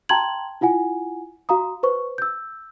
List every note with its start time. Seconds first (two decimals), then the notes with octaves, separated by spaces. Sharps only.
0.09 G5 A5 A#5 C6 G#6 F#7
0.61 E4 F4 F#5 G#5
1.49 F#4 F5 A#5 D#6
1.83 B4 C5 C#6
2.18 E6 G6